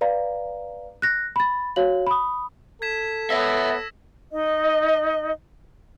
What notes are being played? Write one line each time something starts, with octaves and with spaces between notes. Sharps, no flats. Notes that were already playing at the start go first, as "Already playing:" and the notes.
B4 D5 F5 A#5
F#6 A#6
B5 A6
F#4 C#5 F5 F#7
B5 D#6
A4 G#6 B6 E7
B3 C#5 E5 E6 A#6 B6
D#4 D#5